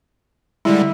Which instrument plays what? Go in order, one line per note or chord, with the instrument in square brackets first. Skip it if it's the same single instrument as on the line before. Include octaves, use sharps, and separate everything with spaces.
[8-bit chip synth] D3 G3 G#3 [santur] E4